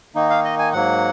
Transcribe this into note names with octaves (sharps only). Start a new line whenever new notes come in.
D#3 A#3 D#4
F5
D#5
G#5
G#2 F#3 A#3 F#5